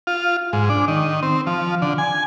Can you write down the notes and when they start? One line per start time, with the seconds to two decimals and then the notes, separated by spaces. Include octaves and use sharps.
0.07 F4
0.53 G#2
0.69 D4
0.88 D#3
1.23 C4
1.47 F3
1.82 D3
1.98 G#5